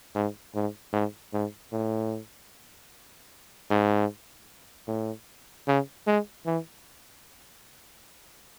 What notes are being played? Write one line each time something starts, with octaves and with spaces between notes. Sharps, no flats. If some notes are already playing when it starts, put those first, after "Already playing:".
G#2
G#2
G#2
G#2
A2
G#2
A2
C#3
G#3
E3